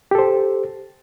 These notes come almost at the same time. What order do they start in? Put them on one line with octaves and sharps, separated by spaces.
G4 A4 C5